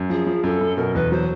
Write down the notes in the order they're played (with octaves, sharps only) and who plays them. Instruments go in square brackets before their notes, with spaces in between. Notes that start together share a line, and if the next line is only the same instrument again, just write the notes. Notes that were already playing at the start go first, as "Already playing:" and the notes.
Already playing: [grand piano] F#2
[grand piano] F3 [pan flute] G#4
[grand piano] F3
[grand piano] F#2 [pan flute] A4
[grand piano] F#2
[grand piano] B2 [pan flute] A#4
[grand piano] E2 [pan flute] B4
[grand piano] F#3 [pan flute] C5